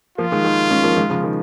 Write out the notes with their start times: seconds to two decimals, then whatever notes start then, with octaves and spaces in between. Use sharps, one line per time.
0.18 F3 A#3 F4
0.32 D#3 G#3
0.44 D#3
0.71 G#3 C#4
0.83 F3 A#3
0.96 D#3 G#3
1.10 C#3 F3
1.24 D#3